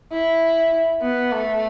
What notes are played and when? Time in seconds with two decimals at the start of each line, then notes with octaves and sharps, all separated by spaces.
0.12 E4
1.02 B3
1.32 A3